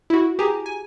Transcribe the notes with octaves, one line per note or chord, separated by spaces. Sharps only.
E4 F#4
G4 G#4 G#5 A#5
G#5